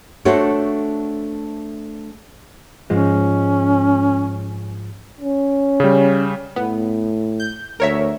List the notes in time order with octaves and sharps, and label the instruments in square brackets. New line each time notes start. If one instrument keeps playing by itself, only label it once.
[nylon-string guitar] A3 D4 F#4 A4 C5 C#5
[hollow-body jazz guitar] G#2 F3 G#3 [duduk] C#4
[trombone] C#4
[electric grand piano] C#3 G3
[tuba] A2 [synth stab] B3
[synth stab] G6
[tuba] D2 [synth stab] A#4 C#5 E5